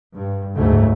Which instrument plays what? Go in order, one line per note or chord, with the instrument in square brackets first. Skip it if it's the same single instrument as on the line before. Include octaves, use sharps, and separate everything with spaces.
[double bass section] G2
F#1 D2 G#2 C#3 F#3 A3